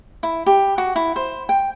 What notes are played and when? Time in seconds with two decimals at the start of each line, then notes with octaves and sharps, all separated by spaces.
0.23 E4
0.46 G4
0.78 F#4
0.96 E4
1.16 C5
1.49 G5